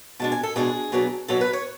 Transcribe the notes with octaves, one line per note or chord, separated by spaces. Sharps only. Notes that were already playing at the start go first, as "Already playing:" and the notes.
B2 G#3 D4 A5
G#5
A4
B2 G#3 D4 G#4
B2 F#3 B3 D4
B2 F#3 B3 D4 A4
B4
C#5